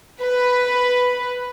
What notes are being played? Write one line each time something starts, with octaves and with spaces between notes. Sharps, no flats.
B4